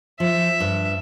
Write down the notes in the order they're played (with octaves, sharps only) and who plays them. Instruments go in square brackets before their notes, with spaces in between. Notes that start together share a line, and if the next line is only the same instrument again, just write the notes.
[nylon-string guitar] F3 [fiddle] E5
[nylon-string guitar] G2